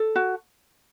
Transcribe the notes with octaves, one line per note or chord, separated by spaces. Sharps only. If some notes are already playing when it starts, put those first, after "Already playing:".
Already playing: A4
F#4